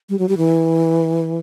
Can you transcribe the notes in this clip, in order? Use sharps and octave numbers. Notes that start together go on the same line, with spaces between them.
G3
F#3
G3
E3